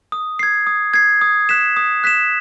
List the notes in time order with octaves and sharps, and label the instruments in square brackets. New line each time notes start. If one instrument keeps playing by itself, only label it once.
[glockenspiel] D#6
G#6 C7
D#6
G#6 C7
D#6
F#6 B6 E7
D#6
F#6 B6 E7